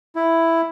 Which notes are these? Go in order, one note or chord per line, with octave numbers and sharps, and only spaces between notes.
E4